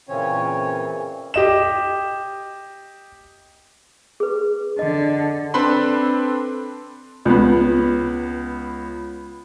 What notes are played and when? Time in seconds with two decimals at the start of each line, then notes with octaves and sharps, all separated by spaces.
0.09 A#2 C#3 E3 C4 C#4 C#5
1.34 G4 D#5 E7
4.20 G#4 B4
4.79 D3 D#5
5.54 C4 D4 A4 B4 B5 C6
7.25 C#2 B3